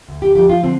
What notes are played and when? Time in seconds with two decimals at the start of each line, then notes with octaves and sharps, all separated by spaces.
0.08 D2
0.22 G4
0.35 F3 G4
0.49 F4
0.63 D3 C4